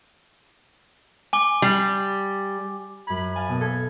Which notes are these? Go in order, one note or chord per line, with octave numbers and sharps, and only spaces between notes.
G#5 D6 G7
G3
F#2 B5 G#6
F5 G#5 A5
B2 A#3
A4 B5 G#6 A6